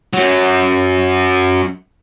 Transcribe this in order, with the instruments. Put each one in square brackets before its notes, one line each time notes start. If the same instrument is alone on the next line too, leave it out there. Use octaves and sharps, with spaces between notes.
[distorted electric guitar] F#2 F#3